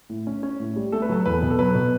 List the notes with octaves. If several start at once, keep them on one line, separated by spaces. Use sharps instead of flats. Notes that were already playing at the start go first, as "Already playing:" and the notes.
A2
C#4
C#4
A2
G3
A3 A4
B4
F#3 A4
E2 B4
B2
A4
F#3 B4
B2